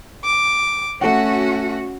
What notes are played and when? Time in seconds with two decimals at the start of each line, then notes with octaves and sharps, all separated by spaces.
0.24 D6
1.01 A3 C#4 F#4 F#5